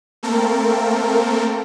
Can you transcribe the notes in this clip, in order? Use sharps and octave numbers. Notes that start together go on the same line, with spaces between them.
A3 A#3 C4 A4 A#4